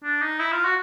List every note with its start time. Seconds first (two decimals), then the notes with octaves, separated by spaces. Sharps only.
0.03 D4
0.22 D#4
0.40 E4
0.52 F4
0.65 F#4